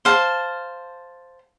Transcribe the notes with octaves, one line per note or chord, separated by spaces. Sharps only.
C5 F5 A5